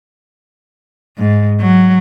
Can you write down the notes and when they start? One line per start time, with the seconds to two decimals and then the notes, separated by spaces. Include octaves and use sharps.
1.19 G#2
1.61 F#3